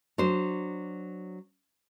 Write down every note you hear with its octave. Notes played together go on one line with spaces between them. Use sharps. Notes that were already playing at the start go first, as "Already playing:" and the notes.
F#3 D4 C5